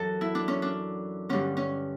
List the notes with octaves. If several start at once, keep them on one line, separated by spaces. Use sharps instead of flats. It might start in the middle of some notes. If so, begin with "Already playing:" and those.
Already playing: F#2 E3 F#4 A4
E4
D4
C#4
D4
G2 D3 C#4
C#4